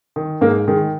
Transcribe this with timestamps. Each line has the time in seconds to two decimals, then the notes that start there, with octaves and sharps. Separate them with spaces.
0.16 D#3
0.41 G#2 A#3
0.68 D#3 G#3